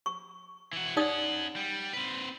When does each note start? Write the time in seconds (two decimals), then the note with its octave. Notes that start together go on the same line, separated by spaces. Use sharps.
0.06 C#6
0.73 E3 F#4
0.97 C#4 D#4 D5 F#5 D#6
1.56 G3
1.93 C4 B4